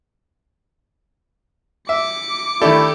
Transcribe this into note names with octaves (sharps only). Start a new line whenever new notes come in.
E5 D6 C#7
D#3 A3 D4 E4 G4 A4